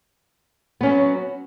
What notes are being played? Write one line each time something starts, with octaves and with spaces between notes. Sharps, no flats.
F#3 B3 C#4